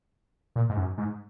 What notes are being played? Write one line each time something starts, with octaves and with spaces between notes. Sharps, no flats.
A#2
G#2
F#2
G#2